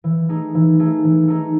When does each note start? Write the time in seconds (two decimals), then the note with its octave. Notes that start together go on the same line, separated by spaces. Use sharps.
0.04 E3
0.29 A3 D#4 G#4
0.55 E3
0.79 A3 D#4 G#4
1.04 E3
1.28 A3 D#4 G#4